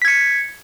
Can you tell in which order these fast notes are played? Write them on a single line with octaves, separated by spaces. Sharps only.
B6 G#6 C#7